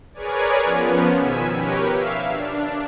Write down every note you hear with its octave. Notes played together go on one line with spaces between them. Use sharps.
G#4 A#4 B4 C#5 D5 G#5
F3 B3 C#4
B2 D#3 G#5 E6 B6
G4 A#4 B4 C#5
E5 F5
D4